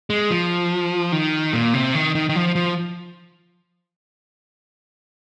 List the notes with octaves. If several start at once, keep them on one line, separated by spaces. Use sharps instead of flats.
G#3
F3
D#3
A#2
C3
D#3
D#3
D#3
F3
F3